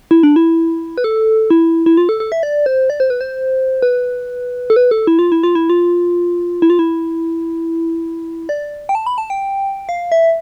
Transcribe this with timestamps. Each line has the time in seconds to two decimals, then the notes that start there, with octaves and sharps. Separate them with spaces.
0.11 E4
0.23 D4
0.36 E4
0.98 B4
1.04 A4
1.50 E4
1.86 E4
1.97 F4
2.09 A4
2.20 A4
2.32 E5
2.43 D5
2.66 C5
2.90 D5
3.00 C5
3.10 B4
3.21 C5
3.82 B4
4.70 A4
4.76 B4
4.91 A4
5.07 E4
5.19 F4
5.32 E4
5.43 F4
5.55 E4
5.70 F4
6.62 E4
6.70 F4
6.79 E4
8.49 D5
8.89 G5
8.95 A5
9.07 B5
9.18 A5
9.30 G5
9.89 F5
10.12 E5